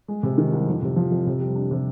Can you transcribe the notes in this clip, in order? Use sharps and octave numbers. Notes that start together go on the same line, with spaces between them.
G#3
C3
D#3
C2
F2
C3
F3
F2
C3
G3
D4
C3